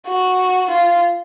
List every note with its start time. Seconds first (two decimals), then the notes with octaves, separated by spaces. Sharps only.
0.08 F#4
0.70 F4